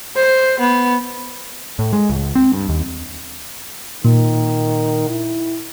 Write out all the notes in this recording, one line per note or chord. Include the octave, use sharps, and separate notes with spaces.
C5
B3
A2
G#3
C#2
C4
G2
D#2
A#2 D#3
E4